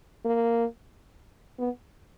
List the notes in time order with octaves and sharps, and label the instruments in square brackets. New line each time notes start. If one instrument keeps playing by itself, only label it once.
[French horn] A#3
B3